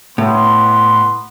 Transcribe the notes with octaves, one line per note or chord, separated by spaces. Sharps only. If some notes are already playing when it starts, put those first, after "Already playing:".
A2 B3 C6